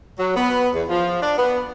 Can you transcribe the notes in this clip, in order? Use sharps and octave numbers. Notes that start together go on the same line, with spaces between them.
F#3
B3
E2
F3
D4
B3